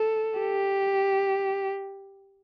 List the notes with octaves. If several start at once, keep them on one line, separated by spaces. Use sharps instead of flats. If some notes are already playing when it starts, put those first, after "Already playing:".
Already playing: A4
G4